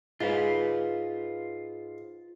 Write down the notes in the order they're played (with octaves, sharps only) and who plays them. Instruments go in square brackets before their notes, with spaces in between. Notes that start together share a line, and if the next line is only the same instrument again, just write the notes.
[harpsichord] G#2 [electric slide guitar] F4 B4